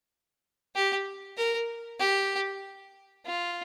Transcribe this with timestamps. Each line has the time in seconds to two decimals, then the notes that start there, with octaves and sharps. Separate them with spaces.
0.75 G4
1.37 A#4
2.00 G4
3.26 F4